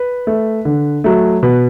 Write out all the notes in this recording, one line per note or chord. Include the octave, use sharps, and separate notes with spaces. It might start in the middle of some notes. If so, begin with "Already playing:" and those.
Already playing: B4
A3
D3
F#3 A3
B2 B4